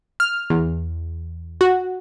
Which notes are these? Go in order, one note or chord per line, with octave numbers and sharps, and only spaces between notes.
F6
E2
F#4